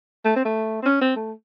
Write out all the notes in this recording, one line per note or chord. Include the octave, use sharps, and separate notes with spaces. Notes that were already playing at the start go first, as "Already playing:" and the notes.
A3
C4
A3
C4
C#4
C4
A3